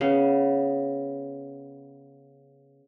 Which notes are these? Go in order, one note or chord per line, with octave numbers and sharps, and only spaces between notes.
C#3 B3